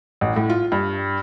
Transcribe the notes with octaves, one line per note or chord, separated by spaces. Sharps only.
A1
A2
F4
G2